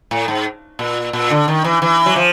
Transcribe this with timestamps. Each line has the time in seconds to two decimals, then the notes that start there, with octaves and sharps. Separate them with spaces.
0.11 A2
0.28 G#2
0.79 A#2
1.13 A#2
1.30 D3
1.48 D#3
1.64 E3
1.82 E3
2.06 F#3
2.16 F3